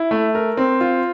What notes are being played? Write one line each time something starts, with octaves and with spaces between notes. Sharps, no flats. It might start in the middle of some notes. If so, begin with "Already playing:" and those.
Already playing: E4
A3
A#4
C4
F4